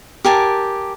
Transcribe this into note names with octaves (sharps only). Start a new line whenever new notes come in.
G4 A#4 G#5 A5